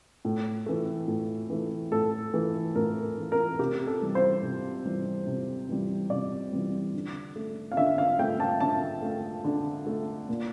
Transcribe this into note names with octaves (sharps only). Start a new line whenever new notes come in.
A2
E3 A3
A2
E3 A3
A2 A4
E3 A3
A2 A#4
E3 A3
A#4
C3 G4
A4
E3 G3
C5
C3
E3 G3
C3
E3 G3
C3 D5
E3 G3
D3
A3
F5
D3 E5
F5
A3 G5
A5
D3 A5
A3
D3
A3
A#2